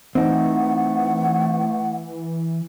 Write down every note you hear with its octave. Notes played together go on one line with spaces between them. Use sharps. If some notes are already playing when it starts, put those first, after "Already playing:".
E3 A3 C4 D#4 F#5